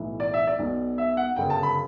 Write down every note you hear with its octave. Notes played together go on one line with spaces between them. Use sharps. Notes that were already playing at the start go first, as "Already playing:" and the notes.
Already playing: B1 A2 E3
D5
E5
D5
B1 B2
E5
F#5
G1 F#2 C#3 G5
A5
B5